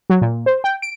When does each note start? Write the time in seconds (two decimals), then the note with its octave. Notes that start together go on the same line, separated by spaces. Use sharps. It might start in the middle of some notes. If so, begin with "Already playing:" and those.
0.10 F#3
0.21 A#2
0.46 C5
0.64 G5
0.82 D7